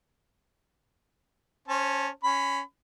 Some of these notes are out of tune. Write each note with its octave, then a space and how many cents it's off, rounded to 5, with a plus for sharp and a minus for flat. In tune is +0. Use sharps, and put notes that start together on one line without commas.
C#4 +0 C5 +35 A5 +0
C#4 +0 B5 +20